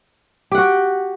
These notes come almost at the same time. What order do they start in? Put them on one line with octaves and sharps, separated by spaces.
G4 F#5 F#4 G5